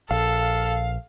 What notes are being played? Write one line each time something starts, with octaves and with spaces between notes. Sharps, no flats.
A#1 A4 F5